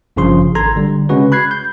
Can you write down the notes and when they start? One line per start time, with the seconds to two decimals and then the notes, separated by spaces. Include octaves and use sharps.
0.16 G#1 G2 C#3 F3 C6
0.55 G#1 A4 A#5 C6 G#6
0.76 D3 G3
1.09 C#3 G#3 C#4 F#4 B4
1.32 B5 F#6 G#6 C7
1.51 G6